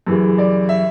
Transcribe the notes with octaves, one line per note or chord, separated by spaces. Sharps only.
F#2 C#3 E3 G3
D5
E5